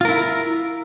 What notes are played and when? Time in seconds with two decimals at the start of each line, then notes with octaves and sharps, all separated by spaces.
0.01 F4
0.05 A#4
0.09 E4